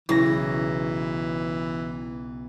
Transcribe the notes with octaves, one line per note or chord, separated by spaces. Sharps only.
B1 C#3 E3 E4 A#6